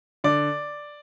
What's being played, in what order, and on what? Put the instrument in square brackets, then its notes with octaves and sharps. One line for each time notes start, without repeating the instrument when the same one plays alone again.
[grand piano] D3 D5